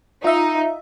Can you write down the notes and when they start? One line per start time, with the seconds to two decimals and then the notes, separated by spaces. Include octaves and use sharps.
0.24 D#4 F4 E5